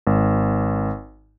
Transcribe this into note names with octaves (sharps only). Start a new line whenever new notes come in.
G#1